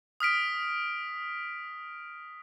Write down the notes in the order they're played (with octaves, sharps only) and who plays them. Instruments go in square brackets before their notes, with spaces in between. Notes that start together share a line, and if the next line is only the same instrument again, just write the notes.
[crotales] D#6 F6 B6 D7